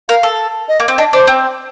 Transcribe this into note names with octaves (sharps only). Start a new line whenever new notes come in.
A#4 F5
A4
D#5
A#3
C4
D4 D#5
D4 C5
C4